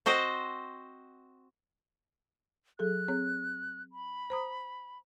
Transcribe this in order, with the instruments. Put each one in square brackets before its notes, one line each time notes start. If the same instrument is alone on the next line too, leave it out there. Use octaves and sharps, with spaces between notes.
[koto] C4 F#4 C5 D#5
[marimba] F#3 G#4 A4 [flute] F#6
[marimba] C4 G#4 C#5
[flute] B5
[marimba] C5 A#5 D#6